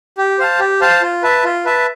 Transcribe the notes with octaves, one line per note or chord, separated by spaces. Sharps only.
G4
C5 F5 A5
G4
C5 F5 A5
F4
B4 E5 A5
F4
B4 E5 A5